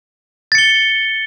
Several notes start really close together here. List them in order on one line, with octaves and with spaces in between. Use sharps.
A6 C#7 G7